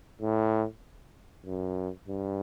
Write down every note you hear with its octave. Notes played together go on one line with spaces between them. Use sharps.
A2
F#2
G2